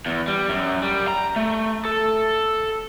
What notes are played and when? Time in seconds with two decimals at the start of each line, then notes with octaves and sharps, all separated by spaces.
0.06 E2
0.28 G3
0.49 F#2
0.82 G3
1.08 A#5
1.36 A3
1.85 A4